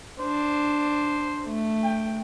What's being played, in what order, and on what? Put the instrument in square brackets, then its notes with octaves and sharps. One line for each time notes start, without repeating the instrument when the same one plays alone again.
[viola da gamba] D4 [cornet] C5
[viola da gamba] A3
[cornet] G5